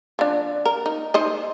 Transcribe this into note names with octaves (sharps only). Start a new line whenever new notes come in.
F3 D4
A#4
D#4
D#4 C5 D#5